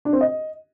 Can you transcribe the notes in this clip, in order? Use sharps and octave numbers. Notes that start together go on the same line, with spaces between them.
D4
C4
D#5